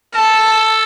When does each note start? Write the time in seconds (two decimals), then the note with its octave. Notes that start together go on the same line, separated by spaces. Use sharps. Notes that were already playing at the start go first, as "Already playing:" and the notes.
0.15 A4 A5